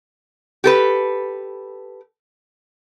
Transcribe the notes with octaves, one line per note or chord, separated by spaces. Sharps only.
G4 A4 B4